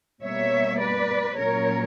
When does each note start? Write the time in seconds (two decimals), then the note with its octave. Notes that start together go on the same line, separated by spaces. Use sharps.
0.22 B2 G3 A#3 C#5 E5
0.79 B4 D5
1.36 A#2 F#3 C#4 A#4 C#5